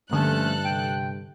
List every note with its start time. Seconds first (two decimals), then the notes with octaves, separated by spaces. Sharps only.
0.11 G2 D3 F3 A3 A#3 C#4 A4 F#6
0.65 C3 G5